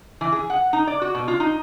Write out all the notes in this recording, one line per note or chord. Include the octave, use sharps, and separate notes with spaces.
E3
G#4
F#5
D#4
D5
F#4
B2
F4
D#4